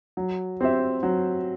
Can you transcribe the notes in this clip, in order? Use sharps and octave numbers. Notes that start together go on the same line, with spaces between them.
F#3
C4 G4 C5 E5
F#3